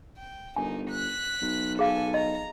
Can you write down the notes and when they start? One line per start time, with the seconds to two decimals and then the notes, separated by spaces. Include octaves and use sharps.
0.18 G5
0.56 G1 A#3 D#4 G#5
0.90 F#6 B6
1.42 B1
1.79 G#4 A4 F5 G#5
2.14 D#5 A#5